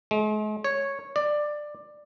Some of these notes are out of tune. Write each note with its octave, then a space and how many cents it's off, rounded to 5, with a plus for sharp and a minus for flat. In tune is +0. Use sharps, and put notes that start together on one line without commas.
G#3 +45
C#5 -5
D5 +15